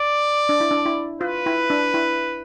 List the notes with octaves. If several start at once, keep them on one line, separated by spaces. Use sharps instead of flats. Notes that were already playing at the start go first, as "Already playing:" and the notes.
Already playing: D5
D4
E4
D4
E4
F4 B4
E4
D4
E4